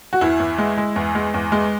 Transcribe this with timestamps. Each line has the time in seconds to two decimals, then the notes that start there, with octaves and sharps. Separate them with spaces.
0.13 F#4
0.21 E2 E4
0.40 E2
0.58 G#3
0.78 G#3
0.96 E2
1.15 G#3
1.34 E2
1.52 G#3